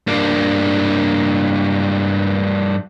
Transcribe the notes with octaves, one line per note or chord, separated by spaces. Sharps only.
G2 A#3